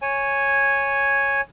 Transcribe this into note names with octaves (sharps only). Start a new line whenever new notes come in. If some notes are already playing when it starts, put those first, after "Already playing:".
C#5 G#5